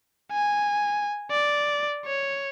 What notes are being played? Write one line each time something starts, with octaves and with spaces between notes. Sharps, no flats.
G#5
D5
C#5